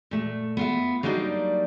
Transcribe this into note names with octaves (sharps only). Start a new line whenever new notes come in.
A#2 A3
B3 F4 E5
F#3 G3 A#3 D4 D#4 D5